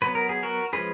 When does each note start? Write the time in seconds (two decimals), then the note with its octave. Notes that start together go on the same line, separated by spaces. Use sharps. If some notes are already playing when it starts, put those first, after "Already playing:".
0.02 F#3 B3 B4
0.15 A#4
0.29 G#4
0.43 F#4 A#4
0.73 F3 G#3 C#4 G#4 B4